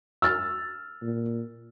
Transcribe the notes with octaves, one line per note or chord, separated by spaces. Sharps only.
E6 F6 A6
A#2